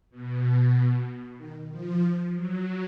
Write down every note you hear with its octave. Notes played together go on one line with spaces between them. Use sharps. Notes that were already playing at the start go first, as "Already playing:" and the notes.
B2
B2
D#3
F3
F#3